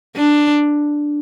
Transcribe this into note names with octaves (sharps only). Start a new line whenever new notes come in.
D4